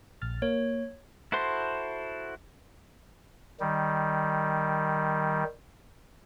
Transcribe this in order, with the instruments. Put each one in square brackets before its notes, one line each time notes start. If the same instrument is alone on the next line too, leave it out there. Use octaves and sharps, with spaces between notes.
[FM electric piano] A#1 F6 A6
[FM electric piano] A#3 [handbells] C#5
[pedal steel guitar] E4 F#4 A4 C5 C6
[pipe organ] D#3 G3